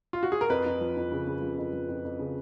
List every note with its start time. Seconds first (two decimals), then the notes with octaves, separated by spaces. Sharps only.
0.13 F4
0.23 F#4
0.32 G#4
0.41 A#4
0.50 F2 B4
0.66 F2
0.81 F3
0.97 F2
1.12 C#3
1.27 C#3
1.42 F3
1.58 F2
1.73 F3
1.89 F2
2.05 F2
2.19 C#3